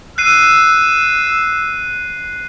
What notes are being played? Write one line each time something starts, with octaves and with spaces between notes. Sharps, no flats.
E6 F#6 C7 D#7